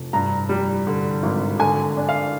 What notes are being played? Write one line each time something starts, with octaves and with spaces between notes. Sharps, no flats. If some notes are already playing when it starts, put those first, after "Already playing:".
Already playing: F1
G2 A#5
G3
D3
G#1
D3 G#5
D4
F5